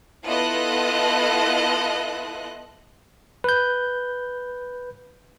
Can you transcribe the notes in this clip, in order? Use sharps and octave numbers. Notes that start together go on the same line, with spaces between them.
B3 E4 F4 A4 D#5 F#6
B4 G6